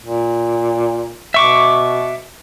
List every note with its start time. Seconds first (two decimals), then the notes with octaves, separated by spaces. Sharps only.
0.02 A#2
1.34 B2 E5 C#6 D6